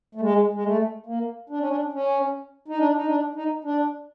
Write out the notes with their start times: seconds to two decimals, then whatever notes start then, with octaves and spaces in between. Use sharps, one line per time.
0.15 A3
0.21 G#3
0.53 G#3
0.64 A3
1.06 A#3
1.49 D4
1.60 C#4
1.69 D4
1.93 C#4
2.68 D#4
2.79 D4
2.95 D#4
3.07 D4
3.35 D#4
3.64 D4